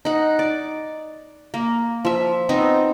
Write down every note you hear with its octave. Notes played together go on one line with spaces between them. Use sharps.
D#4 F#5
D5
A#3
F3 E5
B3 C4 D#4